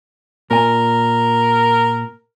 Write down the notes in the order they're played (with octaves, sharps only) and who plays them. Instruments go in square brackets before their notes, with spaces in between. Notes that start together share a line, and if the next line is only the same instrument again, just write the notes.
[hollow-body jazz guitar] A#2 G#5 [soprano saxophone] A#4